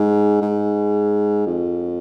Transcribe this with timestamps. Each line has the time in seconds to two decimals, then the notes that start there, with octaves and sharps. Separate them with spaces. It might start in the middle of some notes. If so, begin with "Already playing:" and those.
Already playing: G#2
0.42 G#2
1.46 F2